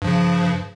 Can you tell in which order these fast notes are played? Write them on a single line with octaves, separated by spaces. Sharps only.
G2 F3 C#3